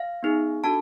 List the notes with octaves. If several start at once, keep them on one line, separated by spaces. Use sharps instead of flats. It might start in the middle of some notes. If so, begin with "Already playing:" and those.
Already playing: F5
B3 D#4 G#4
D4 F#4 A4 A5